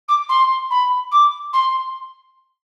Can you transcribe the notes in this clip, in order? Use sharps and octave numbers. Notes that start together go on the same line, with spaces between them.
D6
C6
B5
D6
C6